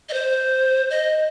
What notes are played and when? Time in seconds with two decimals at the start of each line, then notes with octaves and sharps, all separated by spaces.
0.09 D#5
0.13 C5
0.90 D#5